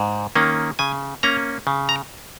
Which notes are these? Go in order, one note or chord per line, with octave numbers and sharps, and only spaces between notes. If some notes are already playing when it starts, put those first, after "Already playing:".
Already playing: G#2
D#3 A#3 C#4
C#3 G#5
A#3 C#4 A#5
C#3
A#5